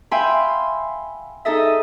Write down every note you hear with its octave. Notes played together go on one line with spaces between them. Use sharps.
E5 F5 G5 G#5 B5 C6
D#4 G#4 A4 D#5 E5